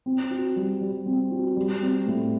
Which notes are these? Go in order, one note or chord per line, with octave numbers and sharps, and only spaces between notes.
C4
F#4
G3
G3
C4
F#4
G3
C4
A2